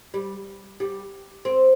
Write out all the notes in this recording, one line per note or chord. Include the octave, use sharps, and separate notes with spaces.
G3
G3
C4